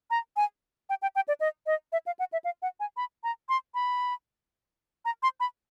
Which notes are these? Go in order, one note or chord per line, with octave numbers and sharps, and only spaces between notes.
A#5
G#5
G5
G5
G5
D5
D#5
D#5
E5
F5
F#5
E5
F5
F#5
G#5
B5
A#5
C6
B5
A#5
C6
B5